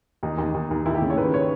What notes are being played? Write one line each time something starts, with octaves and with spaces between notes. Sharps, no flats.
D#2 D#4
D#2
D#4
D#2
D#2
D#2 E4
G4
C#3
C#5
D#3 B4
C#5